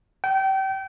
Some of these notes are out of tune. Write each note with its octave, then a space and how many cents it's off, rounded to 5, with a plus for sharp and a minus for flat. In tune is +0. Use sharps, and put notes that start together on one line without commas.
G5 -30